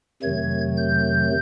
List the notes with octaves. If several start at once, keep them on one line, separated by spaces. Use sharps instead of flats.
F2 C3 D#3 F#3 A3 G#6
G6